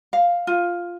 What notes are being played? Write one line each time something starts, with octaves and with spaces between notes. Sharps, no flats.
F5
F4